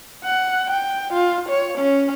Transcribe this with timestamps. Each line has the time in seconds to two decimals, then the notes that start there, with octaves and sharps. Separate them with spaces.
0.24 F#5
0.70 G5
1.13 F4
1.49 C#5
1.78 C#4